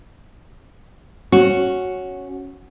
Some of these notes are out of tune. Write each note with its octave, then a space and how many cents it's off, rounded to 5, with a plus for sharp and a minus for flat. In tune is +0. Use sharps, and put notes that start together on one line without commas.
C#4 +0 F#4 +0